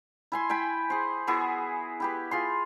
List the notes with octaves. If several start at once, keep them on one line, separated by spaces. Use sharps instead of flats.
E4 G#5 C6
E4 G5 G#5 B5
G#4 C5
B3 E4 F#4 G#4
E4 G4 B4
F4 G#4 C6